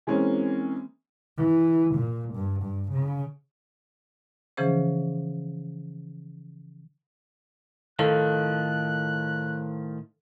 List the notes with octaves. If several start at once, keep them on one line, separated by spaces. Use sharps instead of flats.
E3 G#3 A#3 C4 C#4
E3
A#2
G2
G2
C#3
C#3 E3 F3 C#4 G#4 C5
A2 D#3 F3 A4 F5 F#6